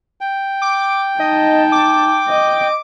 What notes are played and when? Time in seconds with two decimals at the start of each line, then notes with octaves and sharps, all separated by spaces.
0.21 G5
0.62 D6
1.20 D#4 D#5 A5
1.72 D6
2.28 D#5